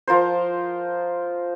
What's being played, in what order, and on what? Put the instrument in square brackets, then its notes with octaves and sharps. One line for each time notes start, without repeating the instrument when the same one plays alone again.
[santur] F3 F4 A#4 C5